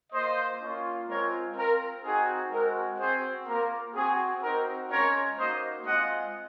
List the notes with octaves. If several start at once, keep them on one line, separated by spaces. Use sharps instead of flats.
A#3 F4 C5 D#5
A#3 C#4 F4
G#3 C4 F4 A#4 C#5
C4 F4 A#4
C4 D#4 F#4 G#4
G#3 C4 F#4 A#4
C4 F#4 G#4 C5
A#3 F4 A#4
C4 F#4 G#4
C4 D#4 F#4 A#4
G#3 C#4 F4 A#4 C#5
A#3 D#4 F#4 C5 D#5
G#3 C4 F4 D#5 F#5